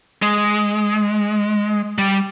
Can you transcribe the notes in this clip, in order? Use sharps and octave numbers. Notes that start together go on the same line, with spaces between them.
G#3
G3